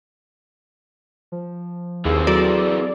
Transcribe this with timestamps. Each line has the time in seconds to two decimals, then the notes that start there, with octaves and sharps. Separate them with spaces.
1.32 F3
2.05 D#2 E3 C4 G#4
2.27 F#3 F#4 A4 D5